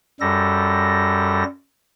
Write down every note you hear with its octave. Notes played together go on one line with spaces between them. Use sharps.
F#2 G3 A4 A#6